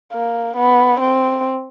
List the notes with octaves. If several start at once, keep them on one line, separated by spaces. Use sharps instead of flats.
A#3
B3
C4